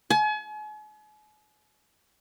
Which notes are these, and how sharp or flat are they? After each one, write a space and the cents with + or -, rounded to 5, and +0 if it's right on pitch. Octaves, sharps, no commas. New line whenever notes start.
G#5 +40